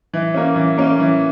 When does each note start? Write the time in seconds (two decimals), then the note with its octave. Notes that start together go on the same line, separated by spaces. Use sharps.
0.13 E3
0.34 A#3 C#4
0.56 E3
0.78 A#3 C#4
1.00 E3